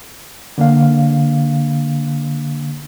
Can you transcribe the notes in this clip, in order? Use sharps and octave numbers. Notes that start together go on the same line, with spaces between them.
D3 A#3 D4 F5